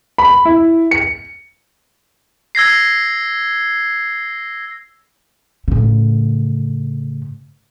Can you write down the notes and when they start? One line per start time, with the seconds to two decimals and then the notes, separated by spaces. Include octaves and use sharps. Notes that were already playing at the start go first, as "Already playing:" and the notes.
0.18 B5
0.45 E4
0.91 C#7
2.55 E6 G#6 A#6 C7
5.68 A2 C#3